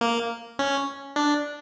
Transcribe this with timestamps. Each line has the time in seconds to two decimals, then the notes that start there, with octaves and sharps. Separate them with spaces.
0.01 A#3
0.59 C#4
1.16 D4